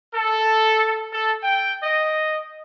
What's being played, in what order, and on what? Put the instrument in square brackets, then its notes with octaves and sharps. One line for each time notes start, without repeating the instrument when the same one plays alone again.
[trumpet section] A4
A4
G5
D#5